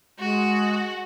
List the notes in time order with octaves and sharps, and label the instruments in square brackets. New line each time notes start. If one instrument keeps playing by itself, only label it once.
[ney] G#3 [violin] F#4